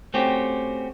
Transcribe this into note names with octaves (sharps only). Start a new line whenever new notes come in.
A3 C4 C#4 F#4 G4